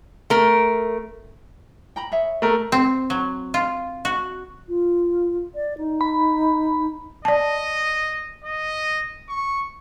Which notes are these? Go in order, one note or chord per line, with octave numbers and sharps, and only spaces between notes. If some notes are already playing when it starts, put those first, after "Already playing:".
A3 A#4
G5 A#5 B5
G#4 C#5 E5
A3 A#4 B5
C4
F#3
F4
F#4
F4
D5
D#4
B5
D5 D#5 A5
D#5
C#6